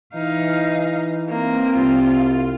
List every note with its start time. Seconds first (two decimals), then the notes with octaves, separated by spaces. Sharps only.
0.15 E3 D#4 F5
1.29 A#3 C4
1.77 C2 F4